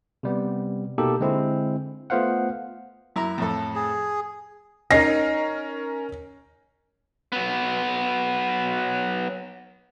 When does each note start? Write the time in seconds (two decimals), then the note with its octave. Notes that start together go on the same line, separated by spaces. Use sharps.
0.23 C3 G3 B3
0.98 B2 A#3 D#4 G4 A4
1.19 D3 G#3 C4 E4
2.10 A3 B3 F4 C5 F5 F#5
3.16 F#2 E4 A#5
3.38 F2 A2 A4
3.75 G#4
4.91 C#4 D#4 A#4 A#6 C7
7.32 F#3 B3